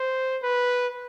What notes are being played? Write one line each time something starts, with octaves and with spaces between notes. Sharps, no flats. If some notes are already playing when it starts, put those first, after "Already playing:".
Already playing: C5
B4